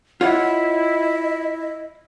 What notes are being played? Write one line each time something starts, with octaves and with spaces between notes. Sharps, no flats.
E4 F4 C#5 D#5 F#5